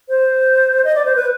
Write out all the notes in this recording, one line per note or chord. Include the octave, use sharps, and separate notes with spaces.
C5
D#5
D5
C5
B4